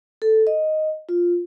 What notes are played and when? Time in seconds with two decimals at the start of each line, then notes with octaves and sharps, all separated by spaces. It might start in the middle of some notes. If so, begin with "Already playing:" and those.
0.22 A4
0.47 D#5
1.09 F4